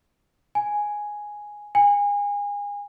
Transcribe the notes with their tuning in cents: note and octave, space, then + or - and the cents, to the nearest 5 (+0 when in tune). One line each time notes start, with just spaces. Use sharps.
G#5 +0
G#5 -30